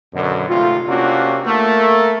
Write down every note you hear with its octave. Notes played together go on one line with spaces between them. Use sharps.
F#2 B2 D3
G#1 C3 A3 F4
C3 A#3 C#4 D4 F4 F#4
A3 A#3 A#4